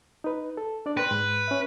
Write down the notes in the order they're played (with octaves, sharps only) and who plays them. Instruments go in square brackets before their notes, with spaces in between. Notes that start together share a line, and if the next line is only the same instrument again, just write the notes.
[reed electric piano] D#4 B4
A4
D4 D5
[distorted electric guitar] B4 [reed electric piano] G5 C6
[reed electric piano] G#2
C#4 E5